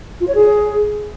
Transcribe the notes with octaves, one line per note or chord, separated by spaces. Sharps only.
F4
C#5
G#4